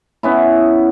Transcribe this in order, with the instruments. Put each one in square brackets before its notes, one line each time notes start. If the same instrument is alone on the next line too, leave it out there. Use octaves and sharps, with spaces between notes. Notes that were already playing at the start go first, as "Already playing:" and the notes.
[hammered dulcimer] B3 C#4 E4